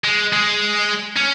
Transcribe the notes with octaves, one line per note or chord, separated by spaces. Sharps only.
G#3
G#3
C#4